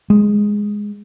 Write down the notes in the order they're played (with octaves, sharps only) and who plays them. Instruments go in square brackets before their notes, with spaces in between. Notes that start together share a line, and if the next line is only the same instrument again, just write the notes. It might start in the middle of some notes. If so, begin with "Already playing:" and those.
[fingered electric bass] G#3